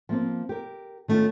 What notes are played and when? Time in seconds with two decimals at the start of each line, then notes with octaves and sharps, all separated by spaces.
0.09 F3 A#3 C4
0.49 G4 A#4
1.08 D#3 A3 C#4 F4